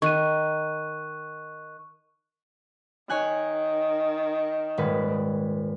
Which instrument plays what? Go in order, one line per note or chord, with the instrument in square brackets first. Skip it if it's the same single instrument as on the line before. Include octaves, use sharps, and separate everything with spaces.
[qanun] D#3 [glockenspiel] C#6 F#6 D#7
[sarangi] D#3 [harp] C#5 G#5 F#6
[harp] D#1 G#2 B4